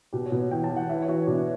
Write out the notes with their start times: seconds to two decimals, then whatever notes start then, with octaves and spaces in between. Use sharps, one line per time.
0.13 B2 G4
0.26 C#5
0.32 B2
0.38 C#5
0.51 E3 G5
0.64 A5
0.70 E3
0.77 F#5
0.89 E3 E5
0.96 B4
1.02 C#5
1.08 E3 F#4
1.14 E4
1.27 B2 D4